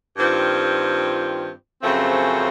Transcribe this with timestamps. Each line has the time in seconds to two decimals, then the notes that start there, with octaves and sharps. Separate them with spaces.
0.17 G2 D#3 G3 C4 F4
1.82 F#2 C#3 F3 A3 C4